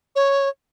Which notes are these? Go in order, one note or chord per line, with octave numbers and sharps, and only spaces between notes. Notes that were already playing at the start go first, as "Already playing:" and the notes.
C#5